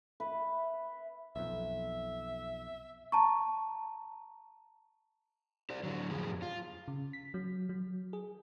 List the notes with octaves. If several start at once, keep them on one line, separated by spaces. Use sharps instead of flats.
B4 E5
B1 F2 E5
A5 A#5 C#6
G4 C5 D5
D3 F#3
F2 A2 F3 G4 G#4
F4
C#3
B6
F#3
F#3
G#4